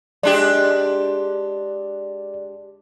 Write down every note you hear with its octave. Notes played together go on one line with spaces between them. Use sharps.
G#3 D4 G4 D5